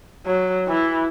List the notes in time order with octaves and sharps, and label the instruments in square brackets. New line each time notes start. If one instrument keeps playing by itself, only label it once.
[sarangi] F#3
E3